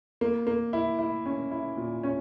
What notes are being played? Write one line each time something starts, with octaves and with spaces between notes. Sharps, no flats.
A#3
A#3
E4
E4
C#4
E4
A#2
C#4